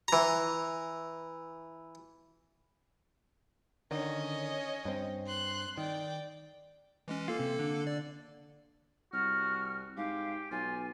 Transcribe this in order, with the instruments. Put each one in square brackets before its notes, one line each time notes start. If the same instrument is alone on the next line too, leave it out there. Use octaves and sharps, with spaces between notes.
[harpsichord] E3 A#5
[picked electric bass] D3 D#3 [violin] C#4 D#5
[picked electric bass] G2 C4
[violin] C6 F#6
[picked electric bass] D#3 [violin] D5 G5
[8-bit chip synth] E3 G#3 C#4
[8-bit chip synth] A#3 A4 [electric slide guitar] F4
[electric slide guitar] C3
D3
[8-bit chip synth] D5
[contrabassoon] C2 [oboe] F#4 [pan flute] F6
[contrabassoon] G#2 [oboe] G4 [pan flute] F5
[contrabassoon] B1 [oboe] F4 [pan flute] G#5